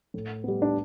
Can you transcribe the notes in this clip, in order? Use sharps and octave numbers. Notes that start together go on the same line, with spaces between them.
A2
G3 B3
D4